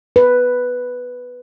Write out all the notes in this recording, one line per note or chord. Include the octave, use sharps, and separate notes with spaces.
B4